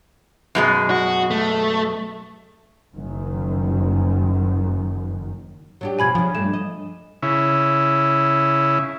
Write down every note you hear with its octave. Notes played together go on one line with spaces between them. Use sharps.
F#2 B2 G#3
F#4
A3
F#1 F#2 D#3
F#3 D4 G4
F#2 B2 F3 G#5 B5 G#6
C#3 F3 D4
G2 A3 D4 E7
D#5
C#3 E4